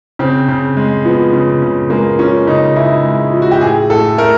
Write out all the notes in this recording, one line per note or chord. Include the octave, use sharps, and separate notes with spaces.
C#3 C4
C#3
G#3
F3 B3
C#3
C#3
G#3 A#3
F3 C#4
C#3 D#4
C#3 E4
G#3
F3
F#4
G4
A2 G#4
A2 A4
A3 A#4